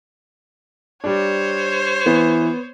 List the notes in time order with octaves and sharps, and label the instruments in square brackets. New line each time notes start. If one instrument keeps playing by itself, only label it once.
[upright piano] G3 D4 [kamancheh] C5 C#5
[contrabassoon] E3 [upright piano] B3